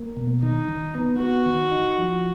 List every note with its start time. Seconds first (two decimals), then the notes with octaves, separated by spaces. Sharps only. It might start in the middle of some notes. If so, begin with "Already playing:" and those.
Already playing: A#3
0.17 B2
0.42 D#3 D#4
0.69 D#3
0.95 B3
1.19 B3 F#4
1.46 D#3
1.72 D#4
1.98 F3